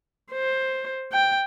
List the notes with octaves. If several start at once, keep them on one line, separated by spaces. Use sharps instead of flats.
C5
G5